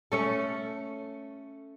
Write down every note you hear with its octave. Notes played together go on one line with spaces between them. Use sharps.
A3 C#4 A4